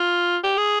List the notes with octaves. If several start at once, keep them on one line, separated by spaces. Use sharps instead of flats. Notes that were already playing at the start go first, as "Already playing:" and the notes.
Already playing: F4
G4
G#4